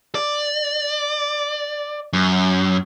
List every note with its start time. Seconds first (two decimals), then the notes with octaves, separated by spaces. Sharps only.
0.15 D5
2.13 F#2